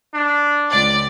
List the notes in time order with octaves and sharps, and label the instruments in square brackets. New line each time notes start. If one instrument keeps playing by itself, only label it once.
[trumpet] D4
[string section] C#2 D5